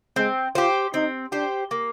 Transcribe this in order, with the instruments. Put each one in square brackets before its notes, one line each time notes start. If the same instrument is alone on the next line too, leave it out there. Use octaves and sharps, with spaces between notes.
[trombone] G#3 [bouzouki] C4
[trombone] F4 [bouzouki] G4 C5
[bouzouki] C4 [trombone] D#4
[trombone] D4 [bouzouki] G4 C5
[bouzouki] A#3